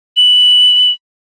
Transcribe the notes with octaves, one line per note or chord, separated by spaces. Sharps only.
F#7